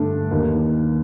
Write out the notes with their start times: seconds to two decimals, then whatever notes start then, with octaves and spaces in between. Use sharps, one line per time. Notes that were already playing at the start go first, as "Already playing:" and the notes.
Already playing: G2 D3 A3 D4 A4
0.31 D#2 D#3 A#3